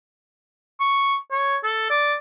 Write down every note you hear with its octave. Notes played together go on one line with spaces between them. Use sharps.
C#6
C#5
A4
D5